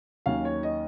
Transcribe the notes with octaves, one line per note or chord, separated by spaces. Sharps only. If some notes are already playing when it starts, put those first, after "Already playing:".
D#2 D#3 F#3 C#4 F5
C#5
D#5